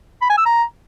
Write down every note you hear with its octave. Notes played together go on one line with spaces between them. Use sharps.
B5
G#5
E6
A#5